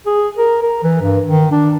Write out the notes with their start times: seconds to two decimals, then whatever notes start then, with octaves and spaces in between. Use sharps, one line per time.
0.06 G#4
0.38 A#4
0.62 A#4
0.83 E3
1.01 G2
1.27 D#3
1.52 D4